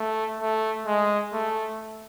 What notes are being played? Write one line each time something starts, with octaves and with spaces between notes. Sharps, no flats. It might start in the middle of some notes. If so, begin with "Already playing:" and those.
Already playing: A3
A3
G#3
A3